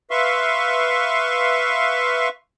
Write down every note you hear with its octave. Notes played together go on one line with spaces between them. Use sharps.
B4 E5 F5 C6 C#6